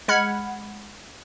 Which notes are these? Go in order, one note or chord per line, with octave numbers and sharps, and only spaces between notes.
G#3 F#5 B5 F6 G#6